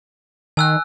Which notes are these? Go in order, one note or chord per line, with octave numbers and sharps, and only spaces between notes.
D#3 G#5 E6 F#6